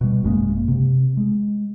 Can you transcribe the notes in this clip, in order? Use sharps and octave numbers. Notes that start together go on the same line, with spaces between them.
B2 G3
G#1 F#2 G#3 A#3
C3
G#3